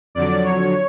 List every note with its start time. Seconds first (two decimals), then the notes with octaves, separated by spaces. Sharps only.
0.15 F2 D3 F#3 D5
0.44 C#5